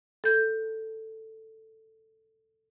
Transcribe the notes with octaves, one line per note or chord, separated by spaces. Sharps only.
A4 G6